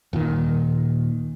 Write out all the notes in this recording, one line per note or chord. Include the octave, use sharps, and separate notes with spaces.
D#1 A#2 D#3